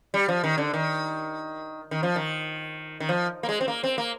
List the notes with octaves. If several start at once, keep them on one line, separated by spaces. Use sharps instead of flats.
G3
F3
D#3
D3
D#3
D#3
F3
D#3
D#3
F3
A#3
G#3
C4
A#3
C4
A#3